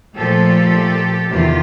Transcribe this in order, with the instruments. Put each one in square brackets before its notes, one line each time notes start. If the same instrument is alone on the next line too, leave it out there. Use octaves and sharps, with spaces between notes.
[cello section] A#2 F3 A3 G4 A4
E2 C3 D#3 F4 G4